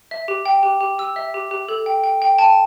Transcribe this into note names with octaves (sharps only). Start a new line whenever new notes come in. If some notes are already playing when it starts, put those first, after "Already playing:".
E5
G4
G5
G4
G4
G4 E6
E5
G4
G4
A4
G5
G5
G5
G5 A5